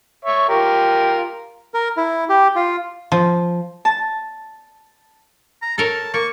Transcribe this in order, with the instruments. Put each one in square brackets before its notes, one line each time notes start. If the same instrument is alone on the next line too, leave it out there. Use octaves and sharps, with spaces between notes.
[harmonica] C#5 E5
F4 G4 A#4
[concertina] A#4
E4
G4
F4
[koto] F3
[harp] A5
[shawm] A#5
[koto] A4 A#4 C#5 [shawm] A5
[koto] A#3 [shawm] C#6